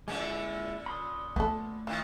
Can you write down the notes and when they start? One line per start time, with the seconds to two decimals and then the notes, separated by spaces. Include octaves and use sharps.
0.08 A#2 D3 G#3 C#4 E4
0.86 B5 C6 D#6
1.36 A3 B3 A4
1.87 A2 D#3 F4